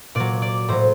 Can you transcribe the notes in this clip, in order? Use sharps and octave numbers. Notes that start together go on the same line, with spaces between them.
A#2 F#3 D5
D5
A2 F#3 C5